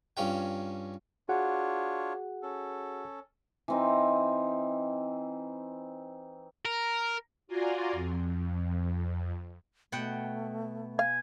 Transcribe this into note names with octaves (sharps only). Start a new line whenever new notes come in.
G2 C#4 F4 G5
D4 F4 F#4 G#4 C#5 F#5
C#4 A4
E3 C4 D#4
A#4
F4 F#4 D5 G#5 A#5 C6
F2
B2 A3 F#5 G5
F5 G#5